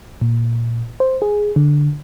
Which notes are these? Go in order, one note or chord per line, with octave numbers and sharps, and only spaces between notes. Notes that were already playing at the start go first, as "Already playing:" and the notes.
A#2
C5
G#4
D3